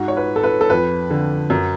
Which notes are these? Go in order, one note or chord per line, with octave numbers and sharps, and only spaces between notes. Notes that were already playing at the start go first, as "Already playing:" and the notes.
Already playing: G#2 F#4
C#5
B4
A4
B4
A4
F2 B4
D3
F#2